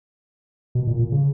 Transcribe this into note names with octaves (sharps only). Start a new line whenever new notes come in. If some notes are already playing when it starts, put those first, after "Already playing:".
B2
A#2
A#2
C#3